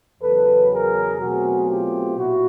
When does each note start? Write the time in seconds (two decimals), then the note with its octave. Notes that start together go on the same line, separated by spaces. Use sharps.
0.21 E2 C#3 F#3 A4 B4
0.70 G#4 A#4
1.20 B2 F#3 A3 C4 F#4 G#4
1.69 F4 G4
2.18 A#2 E4 F#4